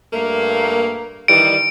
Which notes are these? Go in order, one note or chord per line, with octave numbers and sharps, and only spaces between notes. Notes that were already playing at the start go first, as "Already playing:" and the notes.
G2 A3 A#3
D#3 E3 G3 D7